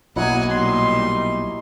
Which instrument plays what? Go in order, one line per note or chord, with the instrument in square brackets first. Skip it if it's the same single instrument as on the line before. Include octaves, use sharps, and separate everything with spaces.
[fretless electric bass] B1 [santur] F#3 E4 D#5 [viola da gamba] A#3 [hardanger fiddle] F#5 G#5
[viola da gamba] A#2 G3 D#4 [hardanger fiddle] C6